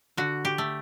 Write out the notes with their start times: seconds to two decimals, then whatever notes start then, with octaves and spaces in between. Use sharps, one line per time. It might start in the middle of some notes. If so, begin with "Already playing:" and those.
0.17 D3 F#4
0.45 G4
0.58 A3